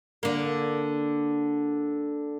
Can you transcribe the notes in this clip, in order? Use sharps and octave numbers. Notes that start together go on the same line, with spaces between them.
D3 A#3